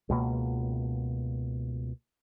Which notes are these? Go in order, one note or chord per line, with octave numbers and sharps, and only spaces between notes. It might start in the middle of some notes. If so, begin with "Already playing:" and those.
C#2 B2 A#3